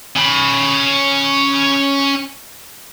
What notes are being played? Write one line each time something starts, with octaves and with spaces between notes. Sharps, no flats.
C#4 B5